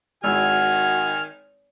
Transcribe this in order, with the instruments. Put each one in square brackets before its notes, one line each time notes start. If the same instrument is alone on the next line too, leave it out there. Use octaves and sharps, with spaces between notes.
[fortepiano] G#1 E4 E6 [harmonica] D#3 G#5 [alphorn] F#4 [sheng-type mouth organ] F6